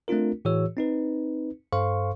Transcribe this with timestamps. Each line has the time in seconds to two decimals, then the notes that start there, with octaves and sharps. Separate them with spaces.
0.08 A3 C4 D4 F4 A#4
0.45 A2 E3 F#4 G#4 C#5 E6
0.77 C4 D#4 B4
1.73 G2 A4 C5 F5 C6 C#6